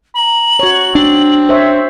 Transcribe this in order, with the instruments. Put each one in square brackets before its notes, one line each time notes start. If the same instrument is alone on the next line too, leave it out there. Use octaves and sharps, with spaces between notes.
[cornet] A#5 [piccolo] F#7
[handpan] F#4 C#5
[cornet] C4 [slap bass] D4
[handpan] C5 C#5 E5